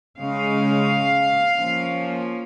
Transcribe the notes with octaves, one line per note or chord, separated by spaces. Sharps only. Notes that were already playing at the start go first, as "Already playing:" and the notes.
C#3 G#3 C#4 F5
F3 A#3 C#4